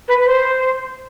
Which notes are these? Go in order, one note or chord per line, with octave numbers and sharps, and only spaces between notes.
B4
C5